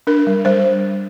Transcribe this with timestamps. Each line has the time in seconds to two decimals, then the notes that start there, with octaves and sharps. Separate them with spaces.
0.07 D4 A#4
0.27 G3
0.45 G3 C5